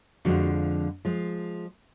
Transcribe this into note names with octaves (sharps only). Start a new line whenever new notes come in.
F2 D3 F3 G#3 F#4
F3 G#3